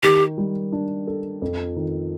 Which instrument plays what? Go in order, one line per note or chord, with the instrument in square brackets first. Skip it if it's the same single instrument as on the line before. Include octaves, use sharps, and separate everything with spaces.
[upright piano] D#3 [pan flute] G4
[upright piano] G3
D4
A4
F2
D#3